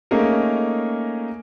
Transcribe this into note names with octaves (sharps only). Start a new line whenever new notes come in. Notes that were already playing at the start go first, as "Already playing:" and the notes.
A3 A#3 C#4 D#4 G#4 A#4